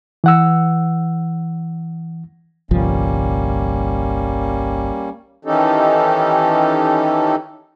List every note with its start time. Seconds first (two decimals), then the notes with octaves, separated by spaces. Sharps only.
0.24 E3 F#5 E6
2.71 G1 C2 F3 G3 A#3 C#4
5.45 D#3 E3 C#4 D#4 G4 A4